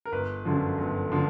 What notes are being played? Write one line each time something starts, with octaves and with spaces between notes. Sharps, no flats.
A#4
G1 B4
F#2 D3 F3
G1
D3 F3